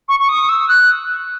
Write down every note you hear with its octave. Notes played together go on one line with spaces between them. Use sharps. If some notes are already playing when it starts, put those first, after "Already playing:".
C#6
C#6
D#6
E6
F#6